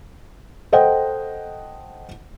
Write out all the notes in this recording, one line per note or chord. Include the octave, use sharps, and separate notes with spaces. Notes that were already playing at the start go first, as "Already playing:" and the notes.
A4 C5 D#5 F#5 G5